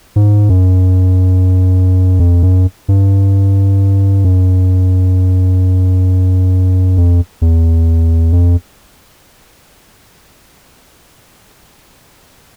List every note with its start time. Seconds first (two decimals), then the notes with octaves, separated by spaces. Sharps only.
0.16 G#2
0.49 F#2
2.20 F2
2.43 F#2
2.88 G2
4.24 F#2
6.97 F2
7.42 E2
8.33 F2